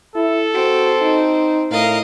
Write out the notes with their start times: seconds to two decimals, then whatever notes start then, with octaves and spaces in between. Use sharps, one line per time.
0.15 E4 A4
0.54 C4 F#4
1.02 D#4
1.71 A2 A#4 D#5 F5